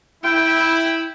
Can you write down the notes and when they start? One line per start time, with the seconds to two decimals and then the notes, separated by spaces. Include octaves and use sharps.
0.24 E4 G5